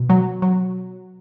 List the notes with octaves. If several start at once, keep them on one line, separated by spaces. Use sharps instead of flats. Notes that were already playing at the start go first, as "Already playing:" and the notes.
Already playing: B2
F#3
F#3